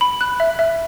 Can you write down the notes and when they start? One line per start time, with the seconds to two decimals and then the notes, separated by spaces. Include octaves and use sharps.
0.01 B5
0.21 F#6
0.40 E5
0.59 E5